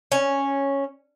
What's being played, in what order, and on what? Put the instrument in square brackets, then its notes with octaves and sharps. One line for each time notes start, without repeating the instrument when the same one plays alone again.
[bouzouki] C#4